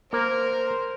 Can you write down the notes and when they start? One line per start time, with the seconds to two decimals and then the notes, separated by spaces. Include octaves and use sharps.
0.13 A#3 A#4 C5